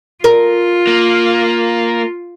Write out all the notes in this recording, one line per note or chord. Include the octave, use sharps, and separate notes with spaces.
F4 A#4
A#3